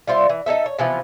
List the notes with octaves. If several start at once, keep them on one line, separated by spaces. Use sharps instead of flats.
G3 F4 C5 E5
E3
D#4 G#4 A4 E5
C#5
C3 E3 F3 B3